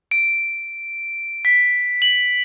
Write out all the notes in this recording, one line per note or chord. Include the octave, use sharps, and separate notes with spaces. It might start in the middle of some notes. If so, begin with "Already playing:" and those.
D7
B6
F#7